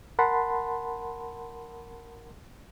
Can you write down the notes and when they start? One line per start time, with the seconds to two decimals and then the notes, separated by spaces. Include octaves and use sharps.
0.19 A#4 F#5 A5 B5 C6